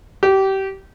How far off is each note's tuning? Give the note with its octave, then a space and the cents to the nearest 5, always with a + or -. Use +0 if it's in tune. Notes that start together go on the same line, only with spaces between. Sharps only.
G4 -25